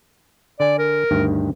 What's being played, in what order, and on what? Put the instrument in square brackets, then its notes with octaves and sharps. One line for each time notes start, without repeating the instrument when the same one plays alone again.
[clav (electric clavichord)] D3 G#5 [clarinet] D5
[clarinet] A#4
[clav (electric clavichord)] D2 G2 D#3